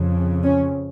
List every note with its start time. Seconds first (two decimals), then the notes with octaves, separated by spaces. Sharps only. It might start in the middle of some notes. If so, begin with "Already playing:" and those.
Already playing: F2 C#3
0.43 C#4